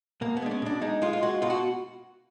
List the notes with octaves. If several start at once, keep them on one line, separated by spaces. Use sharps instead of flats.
B2 A#3
B3
G#3 D4
C#4
B2 D4
G#3 D#4
G#3 F4
F4
G#3 F#4
B2 F4
F#4